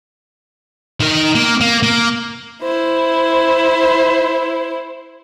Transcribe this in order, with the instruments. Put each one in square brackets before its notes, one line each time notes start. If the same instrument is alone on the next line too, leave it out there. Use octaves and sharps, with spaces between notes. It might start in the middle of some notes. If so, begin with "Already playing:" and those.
[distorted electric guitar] D#3 A#4
A#3
A#3
A#3
[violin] E4 C5